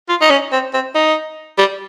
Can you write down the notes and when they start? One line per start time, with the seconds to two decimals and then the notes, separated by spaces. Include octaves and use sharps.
0.09 F4
0.21 D#4
0.30 C#4
0.52 C4
0.74 C4
0.95 D#4
1.58 G3